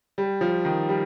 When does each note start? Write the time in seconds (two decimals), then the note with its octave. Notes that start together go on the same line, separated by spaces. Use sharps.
0.18 G3
0.41 F3
0.65 D#3
0.89 G3